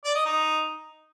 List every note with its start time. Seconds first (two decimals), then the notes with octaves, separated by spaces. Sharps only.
0.04 D5
0.15 D#5
0.25 D#4